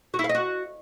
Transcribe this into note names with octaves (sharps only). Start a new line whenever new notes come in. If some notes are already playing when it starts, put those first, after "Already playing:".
F#4
E4
F5
D#5
F#4